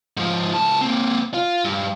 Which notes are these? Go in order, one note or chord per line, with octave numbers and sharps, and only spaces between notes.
G#2 F3
C#2 A5
A#3 C4
F4
G2